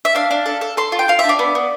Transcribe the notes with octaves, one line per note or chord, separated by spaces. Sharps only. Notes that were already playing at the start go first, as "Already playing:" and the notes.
E5
D4 F5
D4
A4
A4
A4 C6
F4
G5
F4 F5
D4 E5
D5
B3
B3